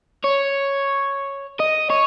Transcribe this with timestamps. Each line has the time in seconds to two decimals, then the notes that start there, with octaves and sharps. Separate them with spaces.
0.24 C#5
1.60 D#5
1.90 C#5